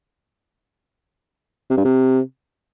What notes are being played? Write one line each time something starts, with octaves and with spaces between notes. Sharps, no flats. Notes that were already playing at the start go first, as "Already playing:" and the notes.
C3
G2
C3